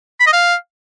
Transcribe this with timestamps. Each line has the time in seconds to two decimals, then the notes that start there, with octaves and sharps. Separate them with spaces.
0.20 B5
0.26 D#5
0.33 F5